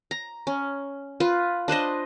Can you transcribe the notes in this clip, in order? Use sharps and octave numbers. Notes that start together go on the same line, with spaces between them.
A#5
C#4
F4 B4
D4 B4 C5 D#5